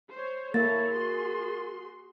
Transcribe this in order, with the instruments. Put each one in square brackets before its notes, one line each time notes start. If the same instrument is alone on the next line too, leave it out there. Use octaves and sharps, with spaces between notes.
[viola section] C5 C#5
[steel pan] A#3 [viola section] E4 A4 C#5 [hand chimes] A#4 A6
[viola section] F#4 G#4 C6